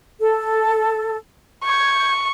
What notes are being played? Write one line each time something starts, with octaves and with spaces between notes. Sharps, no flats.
A4
C#6 G6 G#6